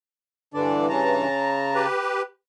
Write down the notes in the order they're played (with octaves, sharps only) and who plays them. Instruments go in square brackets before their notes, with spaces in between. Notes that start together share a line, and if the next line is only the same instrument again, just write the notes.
[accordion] G2 E3 [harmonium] D3 D4 D5
[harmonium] C#3 A5 A#5
[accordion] G4 B4